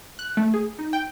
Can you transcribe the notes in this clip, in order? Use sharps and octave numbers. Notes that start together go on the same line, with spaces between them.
F#6
A3
G#4
D#4
G5